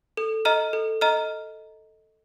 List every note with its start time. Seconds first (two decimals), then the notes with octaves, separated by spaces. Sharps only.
0.17 A4
0.45 D#5 A#5 F6
0.73 A4
1.01 D#5 A#5 F6